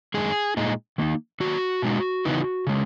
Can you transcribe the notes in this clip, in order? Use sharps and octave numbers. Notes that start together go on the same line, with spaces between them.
F#2 D#3 G#3 G#4
A#2 G#3 D#4
D#3 A#3 D#4
D#3 F#3 A#3 F#4
B2 G#3 D#4
C#3 E3 B3 D#4
C#3 G#3